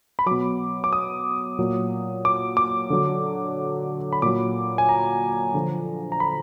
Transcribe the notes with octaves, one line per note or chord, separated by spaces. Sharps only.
B5
B2 F#3 D6
D6
D#6
A#2 F#3
D6
D6
D3 F#3
B5
A#2 F#3 D6
G#5
A#5
D3 F3
A#5
B5